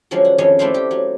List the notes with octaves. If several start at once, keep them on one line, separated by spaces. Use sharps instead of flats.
D3 F3 F#3 G#3 C#4
F#4
F2 D#3 G#3 C#4 C#5
A3 C4 D4 E4 C5 F5
G4
F#3